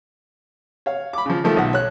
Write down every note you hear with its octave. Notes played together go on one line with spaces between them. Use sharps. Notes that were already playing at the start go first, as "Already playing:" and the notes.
C#5 F5
B5 D6
C#3 F3
D#3 F3 A3
B1 F#5
C#5 F#6